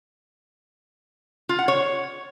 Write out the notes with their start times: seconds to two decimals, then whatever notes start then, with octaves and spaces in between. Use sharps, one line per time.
1.49 F4
1.59 F#5
1.68 C#5